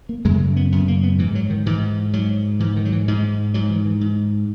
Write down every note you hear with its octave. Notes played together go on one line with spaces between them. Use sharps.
A#3
F#2 C#3 G#3
B3
F#2 C#3 B3
A#3
B3
G#2 E3
F#3
D#3
G#2 E3
G#2 F#3
G#2 E3
D#3
F#3
E3
G#2 G#3
G#2 F#3
E3
E3
G#2